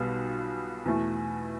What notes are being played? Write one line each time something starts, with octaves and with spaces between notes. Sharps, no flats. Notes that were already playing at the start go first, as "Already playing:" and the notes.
Already playing: B1 B2 G3 B3 F4
E2 B2 A3 E4